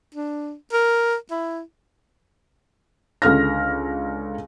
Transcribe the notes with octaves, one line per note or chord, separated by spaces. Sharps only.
D4
A#4
E4
C#2 D3 F6 A#6